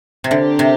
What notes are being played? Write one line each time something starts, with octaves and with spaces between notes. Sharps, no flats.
C3
D3 C4 G4 A#4
C3